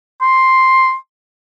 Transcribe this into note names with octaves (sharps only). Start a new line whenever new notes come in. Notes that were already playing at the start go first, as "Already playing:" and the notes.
C6